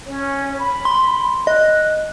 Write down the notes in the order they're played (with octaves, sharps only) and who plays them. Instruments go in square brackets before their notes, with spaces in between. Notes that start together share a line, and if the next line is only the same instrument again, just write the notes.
[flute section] C#4 C#5
B5
[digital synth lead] C6
[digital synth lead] D#5 [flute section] F#6